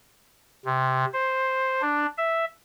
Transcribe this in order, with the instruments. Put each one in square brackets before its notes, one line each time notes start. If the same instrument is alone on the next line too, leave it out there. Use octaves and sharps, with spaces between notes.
[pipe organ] C3
C5
D4
E5